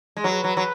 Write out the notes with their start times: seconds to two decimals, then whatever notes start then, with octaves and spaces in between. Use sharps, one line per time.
0.17 G#3
0.24 F#3 B4
0.44 F#3
0.57 F#3